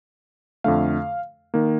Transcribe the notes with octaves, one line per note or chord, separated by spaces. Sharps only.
F2 D3 A3 F5
D#3 A#3